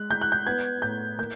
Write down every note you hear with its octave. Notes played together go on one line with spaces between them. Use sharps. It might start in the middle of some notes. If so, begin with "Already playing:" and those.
Already playing: G#3 F#6
G#3 G6
F#6
G6
B3 G#6
A2 G6
A#3 G6